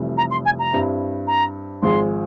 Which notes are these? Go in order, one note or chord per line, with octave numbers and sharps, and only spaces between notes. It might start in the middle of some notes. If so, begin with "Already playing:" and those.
Already playing: F1 F2 E3 G3
A#5
C6
G#5
A#5
G2 G3 C4 E4
A#5
G#1 G#2 F3 G#3 C6